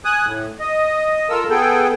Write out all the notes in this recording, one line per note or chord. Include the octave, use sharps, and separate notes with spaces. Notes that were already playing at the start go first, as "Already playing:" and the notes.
G#5 D#6 F#6
A2
D#5
F4 A4 A#4 E6
B3 G#4 A4 G5